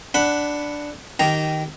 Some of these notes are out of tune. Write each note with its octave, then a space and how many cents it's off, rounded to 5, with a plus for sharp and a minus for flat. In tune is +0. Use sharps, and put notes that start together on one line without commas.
D4 +0 F#5 +0 B5 +0
D#3 +0 G4 -20 A#5 +0